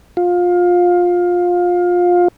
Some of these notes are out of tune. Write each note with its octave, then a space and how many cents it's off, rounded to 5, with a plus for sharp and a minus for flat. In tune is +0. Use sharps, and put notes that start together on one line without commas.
F4 +20